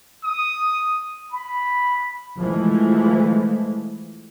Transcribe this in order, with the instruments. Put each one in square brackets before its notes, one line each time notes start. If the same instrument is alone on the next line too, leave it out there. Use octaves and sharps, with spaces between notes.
[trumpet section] D#6
[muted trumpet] B5
[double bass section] E3 F3 G#3 A3